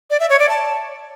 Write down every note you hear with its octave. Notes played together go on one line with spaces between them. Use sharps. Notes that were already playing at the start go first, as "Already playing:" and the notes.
D5
E5
C#5
D5
A5